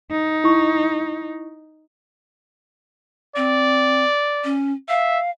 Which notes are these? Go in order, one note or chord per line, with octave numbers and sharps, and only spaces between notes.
D#4
E4 C#6
C4 D5
C#4
E5 F5